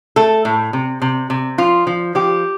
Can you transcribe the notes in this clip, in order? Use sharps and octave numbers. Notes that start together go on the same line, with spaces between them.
A3 A4
A2
C3
C3
C3
F3 F4
F3
F3 G4